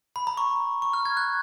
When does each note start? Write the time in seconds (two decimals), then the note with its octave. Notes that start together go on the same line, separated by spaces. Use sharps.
0.16 B5
0.27 A#5
0.37 C#6
0.82 C#6
0.93 F6
1.05 G#6
1.17 F#6